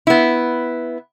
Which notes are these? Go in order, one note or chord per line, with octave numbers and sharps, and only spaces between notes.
B3 E4